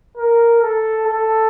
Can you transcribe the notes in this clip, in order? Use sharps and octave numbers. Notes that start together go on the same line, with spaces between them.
A#4
A4
A4